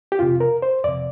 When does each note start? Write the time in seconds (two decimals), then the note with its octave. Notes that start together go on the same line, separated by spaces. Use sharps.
0.12 G4
0.19 F2 C3 F4
0.40 A#4
0.62 C5
0.84 F2 C3 D5